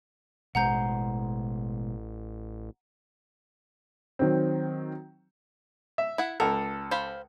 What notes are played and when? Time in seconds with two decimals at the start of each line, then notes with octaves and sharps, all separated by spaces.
0.55 A1 B2 G#3 C5 F#5 A#5 G6
4.19 D#3 F#3 C4
5.98 E5
6.18 E4 F#5
6.40 C#2 A4 A#4
6.91 C5 F5 B5